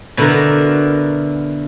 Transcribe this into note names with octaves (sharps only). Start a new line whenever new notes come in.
B2 D3 E4 F#4 A#4